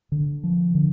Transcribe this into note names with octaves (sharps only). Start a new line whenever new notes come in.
D3
F3
D3